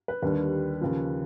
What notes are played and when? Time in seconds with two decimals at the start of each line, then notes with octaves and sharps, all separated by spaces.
0.08 B4
0.22 D#2 D3 G3 B4
0.81 D#2 C#3 F3